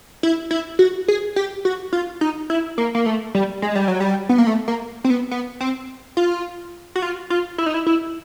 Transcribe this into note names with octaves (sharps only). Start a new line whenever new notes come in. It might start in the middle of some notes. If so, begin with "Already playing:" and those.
E4
E4
F#4
G#4
G4
F#4
F4
D#4
E4
A#3
A#3
A3
G3
G#3
G3
F#3
G3
B3
A#3
A3
A#3
C4
B3
B3
C4
F4
F#4
F4
F4
E4
D#4
E4
E4